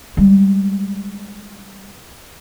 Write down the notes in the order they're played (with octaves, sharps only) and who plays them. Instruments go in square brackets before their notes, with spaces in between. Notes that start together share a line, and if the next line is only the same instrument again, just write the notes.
[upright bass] G3 G#3